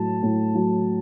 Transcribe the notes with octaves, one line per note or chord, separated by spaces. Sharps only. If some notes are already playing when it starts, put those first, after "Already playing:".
Already playing: A2 F#3 A5
A2
F#3